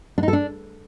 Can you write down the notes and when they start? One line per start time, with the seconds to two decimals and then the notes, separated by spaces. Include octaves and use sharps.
0.18 D4
0.23 D#4
0.28 A4
0.33 D4